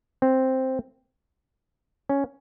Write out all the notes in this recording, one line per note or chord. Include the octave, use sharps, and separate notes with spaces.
C4
C#4